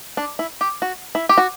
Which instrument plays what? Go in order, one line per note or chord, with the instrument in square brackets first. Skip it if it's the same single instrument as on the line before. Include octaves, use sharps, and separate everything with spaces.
[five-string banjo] D4
E4
G4
F#4
E4
G4
F#4